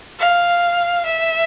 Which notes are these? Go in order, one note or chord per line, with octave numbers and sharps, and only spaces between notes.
F5
E5